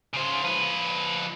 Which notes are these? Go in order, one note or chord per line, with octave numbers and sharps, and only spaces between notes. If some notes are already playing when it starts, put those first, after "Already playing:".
C#3 C5
F3 B4